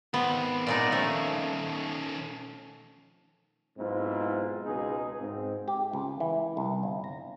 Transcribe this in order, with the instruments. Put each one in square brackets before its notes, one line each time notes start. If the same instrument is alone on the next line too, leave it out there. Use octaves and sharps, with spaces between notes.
[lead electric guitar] D#3 C4 [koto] B3
[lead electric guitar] B1 D5 [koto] A#2 G#3 D#4
[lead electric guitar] D#3 C#4 [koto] F3 A3
[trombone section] B1 G#2 C4 E4 F4
C#2 B2 G#3 D#4 G#4
G#2 C4
[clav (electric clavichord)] G4
C#2
E3
C2
G1
A#5